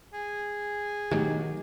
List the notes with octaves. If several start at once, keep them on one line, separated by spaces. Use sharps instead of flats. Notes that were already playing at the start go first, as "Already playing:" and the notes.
G#4
E2 A2 D#3 E3 F#3 D#4 G4